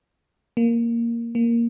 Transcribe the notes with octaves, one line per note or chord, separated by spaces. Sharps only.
A#3
A#3